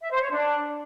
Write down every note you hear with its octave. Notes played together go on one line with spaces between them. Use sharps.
E5
C5
C#5
D4